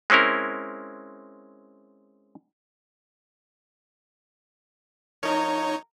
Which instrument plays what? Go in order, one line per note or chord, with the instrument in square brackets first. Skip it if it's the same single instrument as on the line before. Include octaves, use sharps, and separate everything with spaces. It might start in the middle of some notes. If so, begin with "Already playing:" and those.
[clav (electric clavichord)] G#3 C4 C#4 E4 A#4
[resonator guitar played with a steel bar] F3 A#4 [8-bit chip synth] D#4 C#5